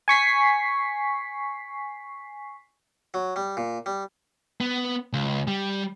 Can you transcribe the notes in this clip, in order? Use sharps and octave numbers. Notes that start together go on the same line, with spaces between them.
G#5 C#6 B6 C7
F#3
G3
A#2
G3
B3
C#2
G3